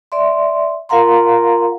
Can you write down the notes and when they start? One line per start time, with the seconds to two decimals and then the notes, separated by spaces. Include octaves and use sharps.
0.12 D5 E5 C6
0.89 F4 A#4 F5 F#5 A#5 C6